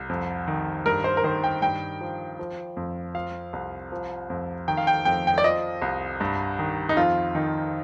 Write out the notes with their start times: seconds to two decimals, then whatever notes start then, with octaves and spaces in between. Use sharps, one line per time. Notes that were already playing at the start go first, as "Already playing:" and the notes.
Already playing: C2
0.09 F2
0.48 D#3
0.86 G2 A#4
1.04 C5
1.17 A#4
1.24 D#3 C5
1.44 G5
1.62 G2 G5
2.01 F3
2.39 F3
2.77 F2
3.14 F3 F5
3.53 C2
3.92 F3
4.30 F2
4.68 D#3 G5
4.77 F5
4.87 G5
5.05 F2 G5
5.27 G5
5.38 D5
5.44 F3 D#5
5.82 C2
6.20 G2
6.59 D#3
6.89 D#4
6.97 F2 F4
7.35 D#3 D#4